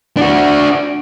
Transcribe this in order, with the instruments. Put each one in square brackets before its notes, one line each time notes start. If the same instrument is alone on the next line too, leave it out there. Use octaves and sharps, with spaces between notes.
[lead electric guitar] D4 F#4